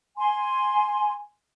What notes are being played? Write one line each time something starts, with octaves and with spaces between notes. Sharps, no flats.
G#5 C6